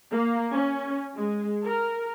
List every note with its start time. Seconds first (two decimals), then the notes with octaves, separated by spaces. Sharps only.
0.11 A#3
0.54 C#4
1.15 G#3
1.67 A#4